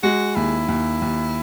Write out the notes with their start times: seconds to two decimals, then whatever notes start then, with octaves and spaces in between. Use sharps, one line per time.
0.03 G#3 F#4
0.36 D#2 E4
0.68 D#2
1.02 D#2